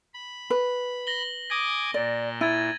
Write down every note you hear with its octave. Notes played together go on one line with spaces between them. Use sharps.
B5
B4
A#6 F#7 G7
G#5 D6 D#6 A#6
A#2 D5
E4 G#6 A6 D#7